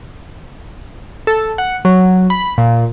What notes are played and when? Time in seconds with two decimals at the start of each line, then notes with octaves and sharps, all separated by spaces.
1.27 A4
1.58 F#5
1.85 F#3
2.30 B5
2.58 A#2